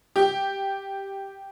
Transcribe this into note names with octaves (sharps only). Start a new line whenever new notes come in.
G4